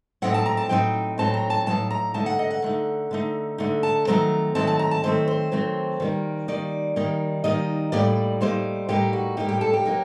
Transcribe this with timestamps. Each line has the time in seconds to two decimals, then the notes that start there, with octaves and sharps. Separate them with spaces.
0.22 A2 F#3 C4 D#4 F#5
0.34 A5
0.46 A#5
0.57 A5
0.69 A2 F#3 C4 D#4 G5
1.18 A2 F#3 C4 D#4 A5
1.34 A#5
1.50 A5
1.66 A2 F#3 C4 D#4 A5
1.91 A#5
2.14 D3 A3 D#4 A5
2.26 F#5
2.39 D#5
2.51 F#5
2.62 D3 A3 D#4
3.11 D3 A3 D#4
3.58 D3 A3 D#4
3.83 A5
4.07 D#3 F#3 A3 C4 A#5
4.55 D#3 F#3 A3 C4 A5
4.67 A5
4.79 A#5
4.91 A5
5.04 D#3 F#3 A3 C4 C5
5.28 C5
5.52 D#3 F#3 A3 C4
6.00 D#3 G3 A#3 D#4
6.48 D#3 G3 A#3 D#4 D5
6.96 D#3 G3 A#3 D#4
7.44 D#3 G3 A#3 D#4 D#5
7.92 A2 G3 A#3 D#4 D5
8.41 A2 G3 A#3 D#4 C5
8.89 A2 G3 A#3 D#4 G4
9.13 F#4
9.37 A2 G3 A#3 D#4 G4
9.49 G4
9.61 A4
9.73 G4
9.85 F#3 A#3 D#4